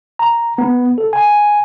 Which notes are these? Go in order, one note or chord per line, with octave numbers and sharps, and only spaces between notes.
A#5
B3
A4
G#5